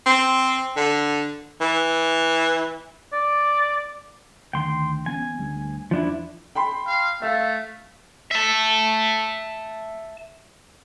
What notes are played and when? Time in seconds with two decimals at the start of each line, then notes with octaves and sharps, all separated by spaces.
0.06 C4
0.76 D3
1.61 E3
3.13 D5
4.53 D2 D#3 G5 C6
5.06 E3 B3 C#4 G#5
5.39 D2 D3 G3
5.91 E2 E3 F3 D4 E4
6.55 G5 B5 C6
6.87 F5
7.22 A3 E5 F5
8.31 E5 A5